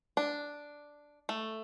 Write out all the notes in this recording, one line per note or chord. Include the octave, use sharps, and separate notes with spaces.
D4
A3